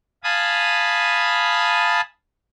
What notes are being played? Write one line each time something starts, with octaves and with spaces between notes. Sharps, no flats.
F5 G#5 A5 B5 D#6